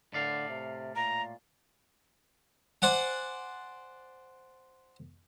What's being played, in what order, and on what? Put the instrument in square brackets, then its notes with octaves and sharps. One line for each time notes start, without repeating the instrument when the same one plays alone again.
[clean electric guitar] A2 D5 F5 [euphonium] D3
[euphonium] C3
[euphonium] A#2 [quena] A#5
[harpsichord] C5 D5 F#5 G#5